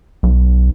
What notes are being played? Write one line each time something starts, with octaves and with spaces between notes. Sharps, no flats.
B1